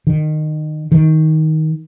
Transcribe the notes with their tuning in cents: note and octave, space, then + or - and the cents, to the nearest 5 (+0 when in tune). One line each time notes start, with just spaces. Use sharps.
D#3 -20
D#3 +15